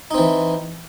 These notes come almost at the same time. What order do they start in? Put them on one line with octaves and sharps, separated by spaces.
D#4 C4 E3